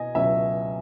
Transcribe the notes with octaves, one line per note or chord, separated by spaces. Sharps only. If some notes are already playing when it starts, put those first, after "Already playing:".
Already playing: B2 D#5 G#5
C#2 B2 F#3 C#4 E5